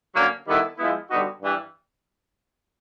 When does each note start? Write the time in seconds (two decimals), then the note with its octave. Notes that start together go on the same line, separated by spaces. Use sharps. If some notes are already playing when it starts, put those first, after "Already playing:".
0.14 D3 F#3 A#3 C#4
0.46 D#3 G3 B3 E4 A4
0.78 F3 G#3 B3 E4
1.09 D3 G3 B3 D#4 F#4
1.41 G2 E3 G3